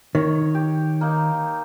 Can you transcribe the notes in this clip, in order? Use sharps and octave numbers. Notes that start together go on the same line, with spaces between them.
D#3 C#5
G4
A#3 D#4